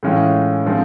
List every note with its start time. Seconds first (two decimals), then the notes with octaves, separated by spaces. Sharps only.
0.03 A2 E3 G#3 C#4 F4
0.64 D3 F3 G#3 C4